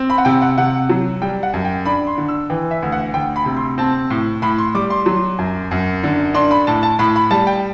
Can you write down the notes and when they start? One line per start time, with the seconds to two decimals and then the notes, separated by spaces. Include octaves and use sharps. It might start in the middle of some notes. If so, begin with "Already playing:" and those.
Already playing: C4
0.10 B5
0.18 F#5
0.25 C3 G5
0.42 F#5
0.58 C3 F#5
0.89 F#3
1.22 G3 G5
1.43 F#5
1.53 F#2
1.65 G5
1.86 D4 B5
2.07 C6
2.18 D3
2.29 E6
2.50 E3 G5
2.71 E5
2.82 D2
2.92 F#5
3.14 D2 G5
3.36 B5
3.46 C3
3.57 C6
3.78 C4 A5
4.10 A2
4.42 A2 B5
4.58 C6
4.75 G3 D6
4.90 C6
5.06 F#3
5.39 F#2
5.71 F#2
6.03 D3
6.35 D4 C6
6.51 B5
6.67 A2 A5
6.83 A5
6.99 A2 B5
7.16 B5
7.31 G3 A5
7.47 G5